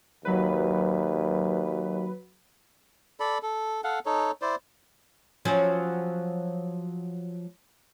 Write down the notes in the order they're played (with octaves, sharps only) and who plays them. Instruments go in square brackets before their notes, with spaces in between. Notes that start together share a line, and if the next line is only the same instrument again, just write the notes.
[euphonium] D#2 [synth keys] F#3 B4
[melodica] A4 D5 B5
A4
A4 F5 F#5
D#4 A4 C#5
E4 C5 D5
[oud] F3 F#3 C#4